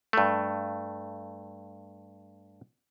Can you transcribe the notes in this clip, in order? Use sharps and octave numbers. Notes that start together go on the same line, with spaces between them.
G2 A3